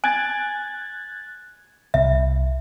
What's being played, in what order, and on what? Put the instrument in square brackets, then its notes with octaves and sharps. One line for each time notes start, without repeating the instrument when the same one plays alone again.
[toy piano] G#5 [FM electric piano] F#6 G#6 A6
[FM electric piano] C2 [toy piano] E5